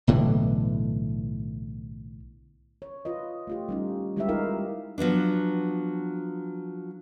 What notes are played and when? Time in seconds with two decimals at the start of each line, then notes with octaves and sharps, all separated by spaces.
0.07 B1 A2 D3 E3
2.82 C#5
3.05 F4 B4 D#5
3.47 A3 F4 G4
3.69 G3 C#4 D#4
4.16 G3 G#3 E4 G4 B4 E5
4.29 D#4 F4 A#4 F5
4.98 F3 F#3 B3 D4